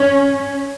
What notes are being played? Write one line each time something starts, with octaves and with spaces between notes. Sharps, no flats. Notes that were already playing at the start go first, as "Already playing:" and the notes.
Already playing: C#4